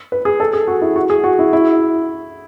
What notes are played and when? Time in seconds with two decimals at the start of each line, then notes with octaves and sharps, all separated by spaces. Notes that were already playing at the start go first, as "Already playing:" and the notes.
0.12 B4
0.25 G#4
0.40 A4
0.53 G#4
0.67 F#4
0.82 E4
0.96 F#4
1.10 G#4
1.24 F#4
1.39 E4
1.53 E4